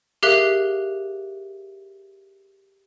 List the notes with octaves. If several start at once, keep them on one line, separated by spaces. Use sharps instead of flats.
G4 G#4 A#4 E5 F5 F#6